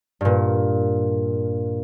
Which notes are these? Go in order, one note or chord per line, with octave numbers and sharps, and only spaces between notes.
G2 A#2